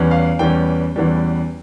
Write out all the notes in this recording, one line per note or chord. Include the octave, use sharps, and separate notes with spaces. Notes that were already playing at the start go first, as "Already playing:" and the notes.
Already playing: E2 E3 G3 C#4
F5
E2 E3 G3 C#4 G5
E2 E3 G3 C#4